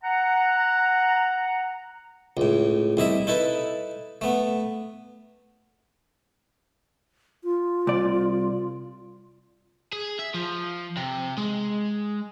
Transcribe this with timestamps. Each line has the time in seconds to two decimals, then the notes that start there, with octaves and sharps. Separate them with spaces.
0.04 F#5 A#5
2.37 C#2 A2
2.97 C2 E4 D#5 E5
3.27 D#4 E4 A4 B4
4.21 A3 B3
7.44 F4
7.87 C2 D5
9.93 G#4
10.19 E5
10.34 F3
10.97 C3
11.38 G#3